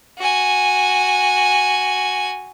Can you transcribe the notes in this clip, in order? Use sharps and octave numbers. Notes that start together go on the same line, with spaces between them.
F#4 G#5